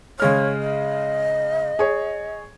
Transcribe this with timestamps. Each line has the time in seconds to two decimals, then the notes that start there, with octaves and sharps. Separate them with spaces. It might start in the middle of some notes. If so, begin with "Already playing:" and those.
0.20 C#3 G#3 C#5 F6
0.60 D#5
1.79 G#4 C#5